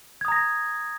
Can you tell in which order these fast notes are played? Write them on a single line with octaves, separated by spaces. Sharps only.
G#6 D#6 A#5 A#6